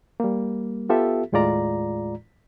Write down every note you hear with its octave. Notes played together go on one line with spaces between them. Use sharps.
G3 A#3
B3 F4 G4 A4 E5
D#2 A2 G#3 F4 D5 A#5